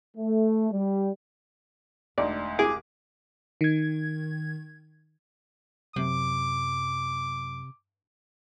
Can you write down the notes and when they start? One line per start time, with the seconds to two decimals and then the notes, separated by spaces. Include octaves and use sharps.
0.16 A3
0.71 G3
2.18 E1 D2 G#3 D#4 D5
2.59 C2 G#4 D6
3.61 D#3 G#6
5.96 F#2 C3 D6